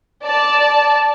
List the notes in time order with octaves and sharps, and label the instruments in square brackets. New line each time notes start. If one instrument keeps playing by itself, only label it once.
[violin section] D5 A5